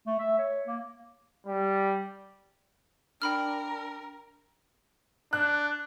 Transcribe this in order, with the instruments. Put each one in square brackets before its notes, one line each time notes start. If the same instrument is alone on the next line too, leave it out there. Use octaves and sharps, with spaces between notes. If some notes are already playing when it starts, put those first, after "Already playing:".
[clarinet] A3
E5
C#5
A#3
[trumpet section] G3
[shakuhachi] D4 [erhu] A#4 [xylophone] G5 B5 F6
[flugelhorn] D4 [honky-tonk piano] F#6